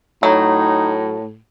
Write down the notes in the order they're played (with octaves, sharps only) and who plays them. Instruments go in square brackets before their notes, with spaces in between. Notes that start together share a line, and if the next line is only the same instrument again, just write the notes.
[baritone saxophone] A2 [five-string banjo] F#3 [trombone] D#4